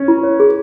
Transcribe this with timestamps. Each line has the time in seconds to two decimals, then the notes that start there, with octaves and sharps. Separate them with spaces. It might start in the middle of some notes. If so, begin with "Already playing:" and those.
Already playing: C#4
0.08 E4
0.23 C#5
0.40 G#4